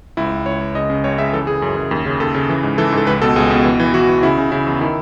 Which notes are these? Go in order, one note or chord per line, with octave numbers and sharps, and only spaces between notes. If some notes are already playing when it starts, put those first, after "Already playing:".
C#2 E4
C#2
C#2 C#5
C#2
C#3 D#5
C#3
C#2 C#5
C#3 E5
E3 A4
C#3 G#4
F#2
F#2
D#2
C#3
D#2 A4
C#3
E3
G#2
E3 A4
G#2
A4
C#2 B4
B2 A4
C#2 G#4
B2
E3
E3
E3 F#4
E3
C#3 E4
C#3
C#3 E4
E2
D#3 E4